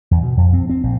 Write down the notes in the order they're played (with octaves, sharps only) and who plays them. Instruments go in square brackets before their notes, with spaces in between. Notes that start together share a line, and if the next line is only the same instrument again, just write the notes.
[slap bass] E2
B2
F2
C4
C4
A#1